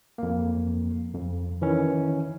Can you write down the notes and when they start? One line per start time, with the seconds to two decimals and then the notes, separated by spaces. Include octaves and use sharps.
0.18 F2 A#3
1.14 F2
1.62 D#3 E3 C#4